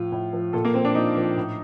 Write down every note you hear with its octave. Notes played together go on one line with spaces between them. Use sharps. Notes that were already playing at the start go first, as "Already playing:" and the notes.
Already playing: A2 F3 F4
A2
F3
A#2 A4
A#3
F3 C4
D4
A#2 D#4
F3
A2